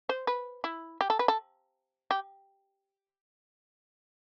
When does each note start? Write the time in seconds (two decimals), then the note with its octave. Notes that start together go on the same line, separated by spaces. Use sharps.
0.09 C5
0.27 B4
0.64 E4
1.01 G4
1.10 A4
1.19 B4
1.28 A4
2.11 G4